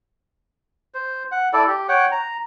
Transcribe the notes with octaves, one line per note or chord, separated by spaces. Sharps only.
C5
F#5
E4 A4 D5
G4
C#5 F#5 G5
A#5